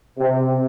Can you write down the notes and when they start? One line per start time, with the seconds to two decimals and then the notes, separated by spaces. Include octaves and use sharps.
0.18 C3